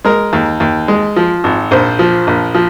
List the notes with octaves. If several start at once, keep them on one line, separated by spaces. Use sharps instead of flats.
G#3 A#4
D#2
D#2
G#3
F3
G#1
A#1 C5
F3
A#1
F3